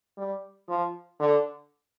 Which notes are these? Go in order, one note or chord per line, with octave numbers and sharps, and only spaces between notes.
G3
F3
D3